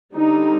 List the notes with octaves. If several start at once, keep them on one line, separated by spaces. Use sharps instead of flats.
D3 G3 C4 D#4